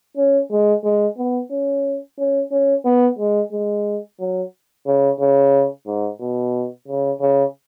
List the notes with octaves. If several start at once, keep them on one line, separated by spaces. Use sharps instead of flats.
C#4
G#3
G#3
B3
C#4
C#4
C#4
B3
G#3
G#3
F#3
C#3
C#3
G#2
B2
C#3
C#3